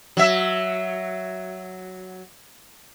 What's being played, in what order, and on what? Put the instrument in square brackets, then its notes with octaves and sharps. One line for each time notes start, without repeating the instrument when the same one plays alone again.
[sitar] F#3 E5